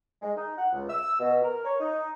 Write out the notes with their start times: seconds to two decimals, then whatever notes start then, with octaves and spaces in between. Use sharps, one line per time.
0.22 G#3
0.36 D#4
0.58 F#5
0.73 C#2
0.89 E6
1.19 B2
1.43 A#4
1.65 C#5
1.80 D#4